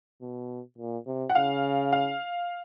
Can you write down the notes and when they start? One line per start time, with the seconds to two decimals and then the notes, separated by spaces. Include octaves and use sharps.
0.21 B2
0.78 A#2
1.07 C3
1.29 F#5
1.35 C#3 F5
1.92 F5